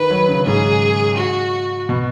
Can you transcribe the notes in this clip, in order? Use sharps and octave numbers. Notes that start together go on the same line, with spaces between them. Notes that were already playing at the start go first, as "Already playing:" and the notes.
Already playing: D#3 B4
F#3
C#3
G#2 G#4
F#4
B2